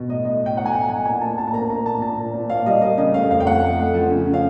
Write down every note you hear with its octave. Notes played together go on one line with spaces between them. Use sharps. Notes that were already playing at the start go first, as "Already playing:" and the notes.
Already playing: B2
A2 D#5
A2 D#5
A2 G5
A2 F#5
G#5
A2 G5
A2 G#5
A#2 G#5
A#2 A5
A#2 A5
A5
A#3 A#5
A#3 A#5
A#2 A5
A#2 A5
A#2
A#2
A#2 F5
G3 D#5
A#3 D#5
C#3 D#5
A3 F5
F2 F5
G5
A3 F#5
A3
A3
F3
C#3
C#3
F5